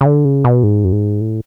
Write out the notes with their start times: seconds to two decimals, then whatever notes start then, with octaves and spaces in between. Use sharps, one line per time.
0.01 C#3
0.06 D3
0.25 C#3
0.44 B2
0.63 G#2
0.84 F#2
0.92 G#2
1.21 A2